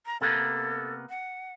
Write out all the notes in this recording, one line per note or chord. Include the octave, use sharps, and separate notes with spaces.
A#5
C3 A#3 B3 A4
F#5